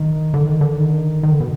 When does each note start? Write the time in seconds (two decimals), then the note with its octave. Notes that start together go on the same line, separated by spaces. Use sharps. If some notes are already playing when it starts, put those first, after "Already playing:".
Already playing: D#3
0.34 D3
0.47 D#3
0.61 D3
0.79 D#3
1.23 D#3
1.32 D3
1.40 B2